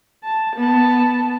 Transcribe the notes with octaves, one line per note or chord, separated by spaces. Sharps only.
A5
B3 A5